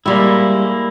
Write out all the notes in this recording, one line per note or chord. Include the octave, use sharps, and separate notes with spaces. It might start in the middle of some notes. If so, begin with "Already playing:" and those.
G3 G#3 A#3 E4